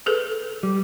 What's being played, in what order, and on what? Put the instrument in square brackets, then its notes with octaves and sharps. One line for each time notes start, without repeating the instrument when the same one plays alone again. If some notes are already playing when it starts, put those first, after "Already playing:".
[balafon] G#4 A4 B4
[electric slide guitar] G3